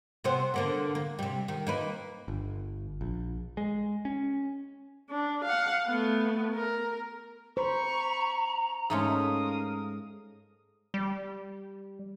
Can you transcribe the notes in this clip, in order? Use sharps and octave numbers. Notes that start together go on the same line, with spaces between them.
C3 B3 C5
D3 A#3 B3
A#3
C3 G3
D#3
A#3 D#4 B4
G1
A#1
G#3
C#4
D4
F5 F#5
A3 B3
A#4
C5 A#5 B5 C#6
G#2 A3 C#4 A#4 F5 D#6
G3